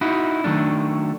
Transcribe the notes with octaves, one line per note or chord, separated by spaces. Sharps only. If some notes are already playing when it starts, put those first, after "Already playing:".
D#4 E4 F#4
D#3 F#3 A3 D4